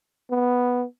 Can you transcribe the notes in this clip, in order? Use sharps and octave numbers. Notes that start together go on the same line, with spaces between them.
B3